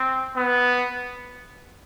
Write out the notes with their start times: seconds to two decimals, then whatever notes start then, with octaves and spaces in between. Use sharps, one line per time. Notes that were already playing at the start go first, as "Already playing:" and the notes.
Already playing: C4
0.37 B3